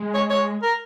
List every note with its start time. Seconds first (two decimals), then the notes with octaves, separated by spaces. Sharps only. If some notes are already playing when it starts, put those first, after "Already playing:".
Already playing: G#3
0.14 C#5
0.30 C#5
0.62 A#4